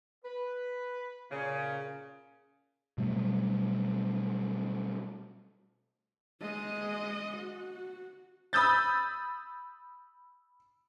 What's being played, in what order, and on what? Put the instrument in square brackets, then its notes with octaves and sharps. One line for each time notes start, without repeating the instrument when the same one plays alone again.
[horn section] B4
A#2 C#3
[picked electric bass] B2 F#3 G3 A3
[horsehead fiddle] G#3 D#5
F#4
[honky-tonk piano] B5 D#6 E6 G6 A6